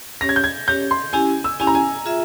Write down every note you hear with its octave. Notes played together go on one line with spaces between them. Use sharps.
C#4 G4 C#5 A#6
G#6
G6
G#6
C#4 G4 C#5 G6
C6
C#4 E4 G4 G#5
E6
C#4 E4 G4 G#5
A#5
G#5
F4 G#4 E5